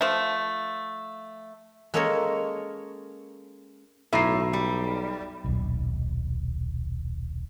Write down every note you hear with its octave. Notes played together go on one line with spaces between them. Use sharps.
F3 A3
G#3 A#3 C#4 A4 A#4 C#5
B1 A2 E5 A#5 C7
G3
D#1 B1